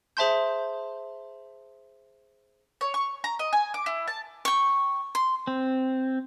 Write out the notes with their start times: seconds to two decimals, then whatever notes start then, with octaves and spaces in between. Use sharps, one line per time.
0.17 G#4 C5 E5 A5 C6 G6
2.81 C#5
2.94 C#6
3.24 A#5
3.39 D#5
3.53 G#5
3.74 D6
3.86 E4
4.08 A5
4.45 G5 C#6
5.15 C6
5.47 C4